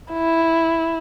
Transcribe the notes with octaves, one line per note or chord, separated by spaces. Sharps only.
E4